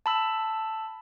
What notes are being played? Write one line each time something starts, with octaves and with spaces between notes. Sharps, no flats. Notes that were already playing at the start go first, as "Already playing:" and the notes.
A5 B5 E6